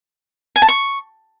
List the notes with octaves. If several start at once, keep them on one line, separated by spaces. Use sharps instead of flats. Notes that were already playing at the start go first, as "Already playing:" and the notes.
G#5
A5
C#6